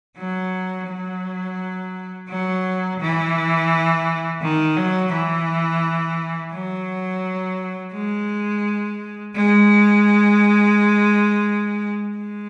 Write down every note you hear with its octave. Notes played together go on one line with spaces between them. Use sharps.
F#3
F#3
F#3
E3
D#3
F#3
E3
F#3
G#3
G#3
G#3